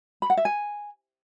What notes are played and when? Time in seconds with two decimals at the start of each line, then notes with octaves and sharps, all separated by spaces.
0.22 B5
0.30 F#5
0.37 E5
0.45 G#5